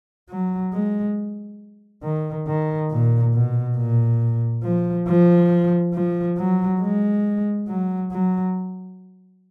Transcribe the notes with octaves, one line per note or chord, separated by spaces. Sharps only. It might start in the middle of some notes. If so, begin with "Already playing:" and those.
F#3
G#3
D#3
D#3
A#2
B2
A#2
F3
F3
F3
F#3
G#3
F#3
F#3